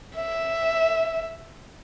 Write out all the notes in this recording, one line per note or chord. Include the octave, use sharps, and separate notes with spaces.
E5